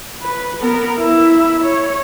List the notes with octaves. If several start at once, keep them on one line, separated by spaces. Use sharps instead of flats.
B4
B3 A#4
E4 E5
C#5